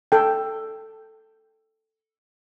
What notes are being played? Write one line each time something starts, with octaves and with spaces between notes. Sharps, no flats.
A4 G5